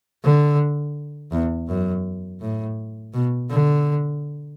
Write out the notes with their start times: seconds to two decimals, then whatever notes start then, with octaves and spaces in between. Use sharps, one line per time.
0.24 D3
1.32 E2
1.69 F#2
2.41 A2
3.14 B2
3.50 D3